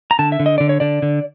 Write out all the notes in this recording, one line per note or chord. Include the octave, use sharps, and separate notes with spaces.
A#5
D3 A5
E5
D3
D#5
D3 D5
C#5
D3 D5
D3